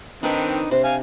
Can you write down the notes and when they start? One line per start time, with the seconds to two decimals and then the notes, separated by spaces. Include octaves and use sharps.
0.23 D#3 C4 D4 D#4 B4 D5
0.71 C3 C5
0.84 F5 G#5